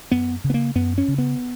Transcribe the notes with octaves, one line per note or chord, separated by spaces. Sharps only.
F#2 B3
C#3
B3
A#3
F#2 B3
C#4
C#3
B3